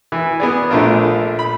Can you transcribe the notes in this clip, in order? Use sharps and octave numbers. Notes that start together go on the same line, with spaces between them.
E3
B3 G#4 D5
A#1 A3 D4 F4 A#4
B5